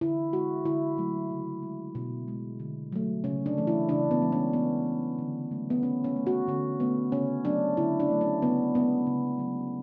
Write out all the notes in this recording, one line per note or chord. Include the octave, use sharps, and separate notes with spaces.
D3 E4
G#3 F#4
D3 E4
F#3 A3
C#3
G#3
B2
G#3
D3
F#3 A3
C#3 C#4
D4
E3 A3
E4
C#3 D4
B3
E3 G#3
C#4
C#3 B3
G#3
D3
F#3 A3
B3
D3 C#4
C#4
A3
F#4
D3 C#4
A3 B3
C#3 C#4
F#3 A3 D4
D3 E4
D4
F#3 A3
C#4
C#3 B3
G#3 B3
C#3
F#3 A3